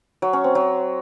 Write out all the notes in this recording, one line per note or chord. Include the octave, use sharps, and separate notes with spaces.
F#3
C#4
C4
F#3